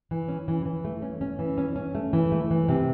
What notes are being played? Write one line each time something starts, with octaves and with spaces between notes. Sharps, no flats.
E3
C#4
E3
E3
A3
C#4
C#4
E3
C#4
C#4
A3
E3
A3
E3
C3